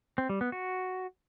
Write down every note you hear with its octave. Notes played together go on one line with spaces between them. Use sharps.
C4
G3
B3
F#4